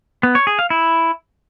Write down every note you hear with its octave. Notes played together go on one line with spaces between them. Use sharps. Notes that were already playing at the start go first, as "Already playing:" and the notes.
B3
C#5
G#4
F5
E4